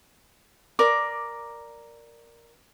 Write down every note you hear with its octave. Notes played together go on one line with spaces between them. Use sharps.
A#4 D5 D6